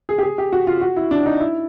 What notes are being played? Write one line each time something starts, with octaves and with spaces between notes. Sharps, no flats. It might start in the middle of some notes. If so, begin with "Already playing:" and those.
G#4
G4
G#4
G4
F#4
F4
F#4
E4
D4
D#4
E4